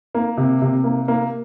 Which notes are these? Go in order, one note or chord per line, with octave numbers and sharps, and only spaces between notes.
A#3
C3
C3
A#3
A#3